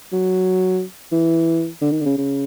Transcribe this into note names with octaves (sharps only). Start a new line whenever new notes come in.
F#3
E3
D3
D#3
D3
C#3
C#3